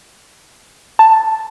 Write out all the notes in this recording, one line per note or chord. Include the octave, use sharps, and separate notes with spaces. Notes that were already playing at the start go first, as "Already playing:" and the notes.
A5